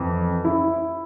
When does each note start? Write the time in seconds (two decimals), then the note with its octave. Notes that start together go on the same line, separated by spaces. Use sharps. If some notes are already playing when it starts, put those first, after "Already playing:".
Already playing: F2 E3
0.44 E4